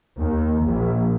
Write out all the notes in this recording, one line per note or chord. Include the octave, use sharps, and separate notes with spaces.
D#2
A#1